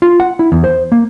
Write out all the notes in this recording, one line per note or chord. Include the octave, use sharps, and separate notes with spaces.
F4
F#5
E4
E2
C5
A#3